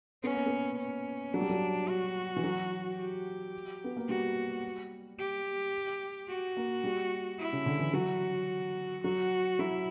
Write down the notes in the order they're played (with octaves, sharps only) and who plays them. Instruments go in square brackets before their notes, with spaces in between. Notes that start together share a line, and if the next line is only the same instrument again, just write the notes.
[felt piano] B3 [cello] C#4
[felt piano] A#3
B3
[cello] C#4
[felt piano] F#3 [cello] D4
[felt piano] G3
F#3
[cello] F#4
[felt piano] E3
F#3
[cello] G4
[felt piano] B3
A#3
[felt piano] G3 [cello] F#4
[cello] G4
F#4
[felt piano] A#3
G3
[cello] E4
[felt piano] C#3
D3
E3
[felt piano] F#3 [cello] F#4
[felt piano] F#3 [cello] F#4
[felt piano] F#3 [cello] E4